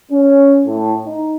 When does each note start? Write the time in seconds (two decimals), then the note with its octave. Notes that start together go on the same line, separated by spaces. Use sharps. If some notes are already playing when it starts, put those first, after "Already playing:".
0.11 C#4
0.66 A2
1.05 D#4